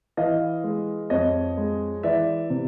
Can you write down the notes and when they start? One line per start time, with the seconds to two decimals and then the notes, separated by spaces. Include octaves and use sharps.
0.17 E3 D#5 F5
0.64 G#3
1.10 F2 C#5 D#5
1.57 G#3
2.03 E3 D5 E5
2.50 C3